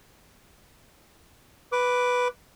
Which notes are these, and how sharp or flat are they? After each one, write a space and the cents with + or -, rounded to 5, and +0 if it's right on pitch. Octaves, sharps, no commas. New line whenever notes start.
B4 +0 D6 +0